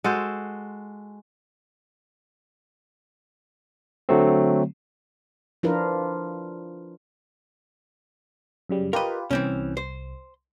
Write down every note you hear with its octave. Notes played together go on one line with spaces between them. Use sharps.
G#3 F#4 A4 C5
D3 F#3 A3 C4
F3 D4 E4 F4 A#4 B4
F#2 C#3 G3
F4 G4 A#4 B4 D#5
C2 E3 C4 C#4
C5